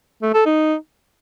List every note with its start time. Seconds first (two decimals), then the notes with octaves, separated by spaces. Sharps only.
0.22 A3
0.34 A4
0.46 D#4